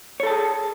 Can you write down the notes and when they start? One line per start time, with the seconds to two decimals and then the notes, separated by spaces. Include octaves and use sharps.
0.20 C#5
0.23 A4
0.27 A5
0.30 G#4